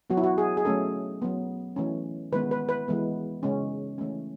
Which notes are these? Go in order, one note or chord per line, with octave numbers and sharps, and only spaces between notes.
F#3 B3 F#4
E4
F#4
G#4
G#4
F#3 A3 C#4 A4
F#3 B3
E3 A3 C#4
D#3 G#3 B3 B4
B4
B4
E3 G#3 B3
C#3 G#3 C#4
E3 A3 C#4